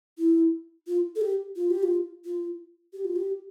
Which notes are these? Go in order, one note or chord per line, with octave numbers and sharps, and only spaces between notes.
E4
F4
A4
G4
F4
G4
F4
F4
G4
F4
G4